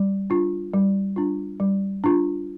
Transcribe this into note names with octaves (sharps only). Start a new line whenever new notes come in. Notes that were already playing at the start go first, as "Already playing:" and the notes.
Already playing: G3
D4 F4
G3
D4 F4
G3
D4 F4